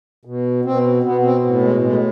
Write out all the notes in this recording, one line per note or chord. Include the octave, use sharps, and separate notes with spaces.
B2
B2 C4
B2 B3
C4
A2
G#3
A2 G#3